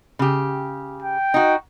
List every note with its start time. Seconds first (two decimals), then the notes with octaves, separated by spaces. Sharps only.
0.19 C#3 G4
1.02 G5
1.34 D#4 F#4